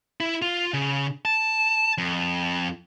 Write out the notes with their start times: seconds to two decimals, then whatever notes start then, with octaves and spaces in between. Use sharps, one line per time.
0.20 E4
0.42 F4
0.74 C#3
1.25 A5
1.98 F2